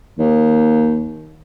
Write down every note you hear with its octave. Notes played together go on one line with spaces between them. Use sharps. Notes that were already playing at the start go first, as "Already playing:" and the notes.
D#2